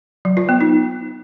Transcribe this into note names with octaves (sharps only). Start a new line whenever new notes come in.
F#3
F4
B3
D#4